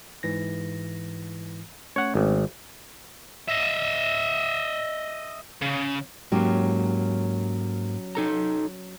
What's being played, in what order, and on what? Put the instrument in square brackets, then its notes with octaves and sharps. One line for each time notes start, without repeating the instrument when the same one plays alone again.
[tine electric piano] G#2 E3 A#6
[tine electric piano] A3 C#4 [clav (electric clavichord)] C#5 F#5
[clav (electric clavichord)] G#1
[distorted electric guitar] D#5 E5
C#3
[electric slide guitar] G#2 A#3 [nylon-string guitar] F#3 C#4 G4
[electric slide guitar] D#4 A4 A#5